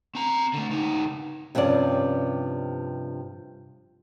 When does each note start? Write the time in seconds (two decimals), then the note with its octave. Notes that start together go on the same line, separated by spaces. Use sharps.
0.15 C4 A#5
0.54 D3 A3
0.70 C#2 D#4
1.55 G2 C3 F3 C#4 D5